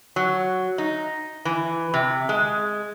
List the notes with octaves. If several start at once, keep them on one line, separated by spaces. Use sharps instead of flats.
F#3
D#4
E3
C3
G#3